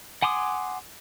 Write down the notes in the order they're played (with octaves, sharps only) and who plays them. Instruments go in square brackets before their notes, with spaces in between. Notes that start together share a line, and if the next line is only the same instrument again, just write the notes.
[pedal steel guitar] F#5 G#5 C6 D6 D#6